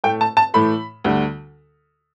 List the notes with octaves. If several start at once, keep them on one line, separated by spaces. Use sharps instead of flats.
A2 A3 G5
A5
A5
A2 E3 A3 B5
D2 D3 G3